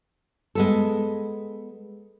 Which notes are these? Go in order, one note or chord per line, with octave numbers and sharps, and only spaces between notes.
G#3 B3 A4